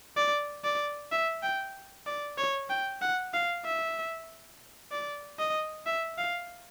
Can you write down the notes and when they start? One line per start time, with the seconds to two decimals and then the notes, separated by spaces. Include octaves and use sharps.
0.17 D5
0.65 D5
1.12 E5
1.43 G5
2.07 D5
2.38 C#5
2.70 G5
3.02 F#5
3.34 F5
3.65 E5
4.92 D5
5.39 D#5
5.86 E5
6.18 F5